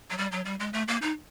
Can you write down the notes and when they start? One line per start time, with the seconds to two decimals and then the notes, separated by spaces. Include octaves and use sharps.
0.10 F#3
0.18 G3
0.32 F#3
0.45 G3
0.60 G#3
0.73 A3
0.88 A#3
1.02 D#4